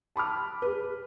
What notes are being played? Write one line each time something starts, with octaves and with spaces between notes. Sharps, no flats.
A5 B5 D6 F6
G#4 B4